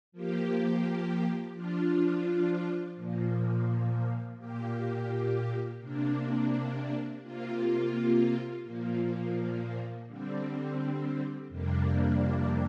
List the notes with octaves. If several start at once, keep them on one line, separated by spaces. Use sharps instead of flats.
F3 A#3 G4
F3 D4 F4
A#2 F3 A#3
A#2 A#3 G4
C3 A#3 D4
C3 A#3 F4
A#2 F3 A#3
D3 G3 C4
F2 C3 G3 A#3 D4